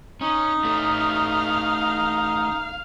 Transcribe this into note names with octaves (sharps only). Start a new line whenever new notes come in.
C#4 D#4
A3 C#4 F5